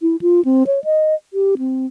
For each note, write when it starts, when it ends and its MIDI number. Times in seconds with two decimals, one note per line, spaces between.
0.02 0.16 64
0.21 0.44 65
0.45 0.63 60
0.67 0.83 73
0.84 1.14 75
1.33 1.55 67
1.58 1.86 60